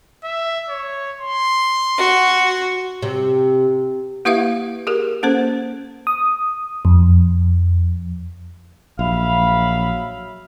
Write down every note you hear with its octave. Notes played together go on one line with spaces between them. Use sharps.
E5
C#5
C6
F#4
C3
A#3 E4 G4 B4 E5 F5
G4 G#4 A#4
A#3 C#4 A4 C5
D#6
F2
A#1 F#3 E5 F5 B5